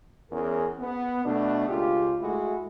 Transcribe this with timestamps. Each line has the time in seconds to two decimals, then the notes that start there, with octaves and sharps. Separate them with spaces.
0.31 E2 C#4 G#4 A#4
0.79 B3
1.24 B2 A3 D4
1.67 C#2 F4 G4
2.20 G#3 A3 E4 F#4